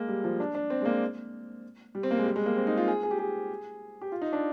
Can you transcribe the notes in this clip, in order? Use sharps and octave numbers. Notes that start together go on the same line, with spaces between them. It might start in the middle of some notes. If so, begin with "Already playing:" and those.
Already playing: G#3 A#3
G3
F3
D4
D4
C4
G#3
A#3
G3
C4
A#3
G#3
G3
G#3
A#3
C4
D#4
F4
G#4
G#4
G4
G#4
G4
F4
D#4
D4